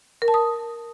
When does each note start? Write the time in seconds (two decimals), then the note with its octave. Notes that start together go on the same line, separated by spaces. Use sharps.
0.22 A#4
0.28 A5
0.34 D#6